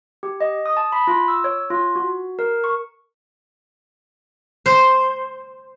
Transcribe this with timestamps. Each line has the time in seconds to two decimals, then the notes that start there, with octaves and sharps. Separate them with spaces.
0.23 G4
0.41 D#5
0.66 D#6
0.77 A5
0.92 B5
1.07 F4
1.28 E6
1.44 C#5
1.70 F4
1.96 F#4
2.39 A#4
2.64 C#6
4.66 C5